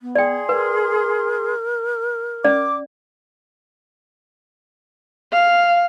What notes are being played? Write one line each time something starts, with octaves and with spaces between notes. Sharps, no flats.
B3
G#4 D5 G5 C6
A#4 B4
C#4 D5 D6
F5